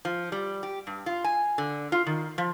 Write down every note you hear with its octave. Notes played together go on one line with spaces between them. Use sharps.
F3
G3
G4
G2
F4
G#5
D3
F4
D#3
F3